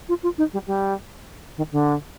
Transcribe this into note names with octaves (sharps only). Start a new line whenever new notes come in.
F4
F4
D#4
G3
G3
D#3
D3